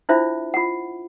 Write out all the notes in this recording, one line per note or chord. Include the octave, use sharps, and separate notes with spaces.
D4 E4 F4 C5 E5
F4 F#5